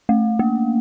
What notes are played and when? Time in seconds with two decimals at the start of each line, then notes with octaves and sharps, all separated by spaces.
0.09 A3
0.39 A#3